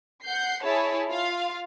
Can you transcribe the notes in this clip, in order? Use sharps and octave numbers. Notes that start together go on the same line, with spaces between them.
F#5 G6 C7
E4 G#4 C#5 A5
F4 F5